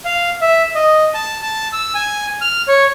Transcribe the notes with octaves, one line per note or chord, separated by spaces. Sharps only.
F5
E5
D#5
A5
A5
E6
G#5
F6
C#5